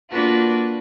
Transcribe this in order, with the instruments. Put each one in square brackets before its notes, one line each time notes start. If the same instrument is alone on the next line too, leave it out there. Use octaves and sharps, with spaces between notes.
[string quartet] A#3 D4 F4 F#4 B4